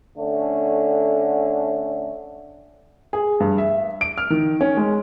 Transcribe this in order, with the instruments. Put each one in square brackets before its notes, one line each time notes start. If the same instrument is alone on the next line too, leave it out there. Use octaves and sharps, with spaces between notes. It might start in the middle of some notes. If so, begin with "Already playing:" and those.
[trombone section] D3 A3 C#4
[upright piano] G#4
G2
E5
D7
F6
D#3
C#4
G#3